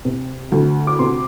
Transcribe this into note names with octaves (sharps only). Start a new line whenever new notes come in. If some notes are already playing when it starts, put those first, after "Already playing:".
C3
D2
D6
C3 C6